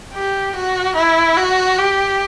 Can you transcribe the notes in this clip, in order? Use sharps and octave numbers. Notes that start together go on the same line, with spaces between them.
G4
F#4
E4
F#4
G4